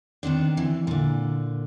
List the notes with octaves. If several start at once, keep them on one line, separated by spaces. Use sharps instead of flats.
D#3 B3 C4 D4
E3
A#2 D3